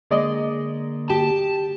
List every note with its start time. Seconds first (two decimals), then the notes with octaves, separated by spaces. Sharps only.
0.11 D3 G#3 A#3 D5 D#5
1.10 G4 A5